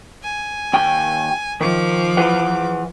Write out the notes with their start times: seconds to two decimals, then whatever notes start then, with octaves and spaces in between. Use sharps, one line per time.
0.23 G#5
0.73 D#2 G5
1.61 D#3 F3 D6
2.17 E3 B4 F#5